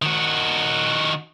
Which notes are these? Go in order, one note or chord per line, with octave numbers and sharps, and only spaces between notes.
D#3 F#4